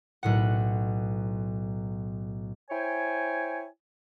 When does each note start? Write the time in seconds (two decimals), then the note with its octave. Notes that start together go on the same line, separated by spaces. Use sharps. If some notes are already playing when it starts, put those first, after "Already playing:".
0.23 B1 A2 F#5
2.71 E4 C5 C#5 G5 G#5